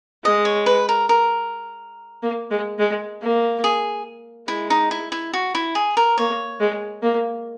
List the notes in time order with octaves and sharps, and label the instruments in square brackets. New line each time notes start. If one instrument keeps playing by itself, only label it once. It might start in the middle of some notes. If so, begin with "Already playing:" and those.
[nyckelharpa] G#3 [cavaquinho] D#5
[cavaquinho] C#5
B4
A#4
A#4
[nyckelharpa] A#3
G#3
G#3
A#3
[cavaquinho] G#4
[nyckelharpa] G#3 [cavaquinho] E4
[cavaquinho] D#4
E4
E4
F#4
E4
G#4
A#4
[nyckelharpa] A#3 [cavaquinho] C#5
[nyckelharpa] G#3
A#3